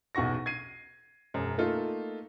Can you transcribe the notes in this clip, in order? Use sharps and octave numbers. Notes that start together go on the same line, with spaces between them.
B1 E2 F#4 C#6 A#6
G#6 C7 D#7
E1 F#2
A3 A#3 D#4 F4 A4